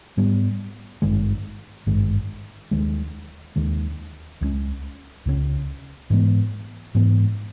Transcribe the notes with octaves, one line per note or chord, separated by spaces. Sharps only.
G#2 G3 B3
G#1 G2 D#3 G#3
G#1 G2 D#3 G#3
D#2 D#3 G#3
D#2 D#3 G#3
C#2 C#3 G#3 C#4
C#2 C#3 G#3 C#4
G#2 E3 G#3 B3
G#2 E3 G#3 B3